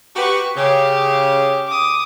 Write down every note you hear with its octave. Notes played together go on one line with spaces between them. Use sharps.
F#4 G4 B4 C#6
C#3 G4
D6 D#6